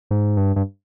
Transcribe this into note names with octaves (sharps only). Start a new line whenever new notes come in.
G#2
G2
G2